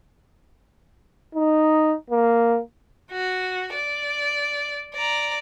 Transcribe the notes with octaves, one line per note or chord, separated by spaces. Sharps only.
D#4
A#3
F#4
D5
D5 A#5